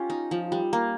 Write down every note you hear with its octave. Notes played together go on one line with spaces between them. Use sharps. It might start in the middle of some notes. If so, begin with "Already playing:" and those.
Already playing: C#4 F4 G4
D#4
F3
G3
A#3